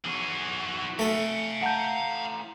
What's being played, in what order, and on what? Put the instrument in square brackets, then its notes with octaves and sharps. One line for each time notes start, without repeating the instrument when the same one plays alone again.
[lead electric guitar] B1 F#4 [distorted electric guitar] E3 G#4
[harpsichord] A3 A4 [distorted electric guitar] F5 G#5
[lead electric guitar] A2 A#5 [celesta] F#5 A5 G6